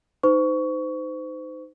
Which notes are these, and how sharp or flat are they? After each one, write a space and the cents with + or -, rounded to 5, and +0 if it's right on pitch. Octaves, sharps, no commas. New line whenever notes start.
D#4 +0 C5 -35 C#6 +20